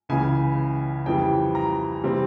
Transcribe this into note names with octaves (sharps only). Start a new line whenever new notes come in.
C#2 C#3 E3 G#5
F2 C#3 E3 G3 G5
A#5
C3 E3 G3 C4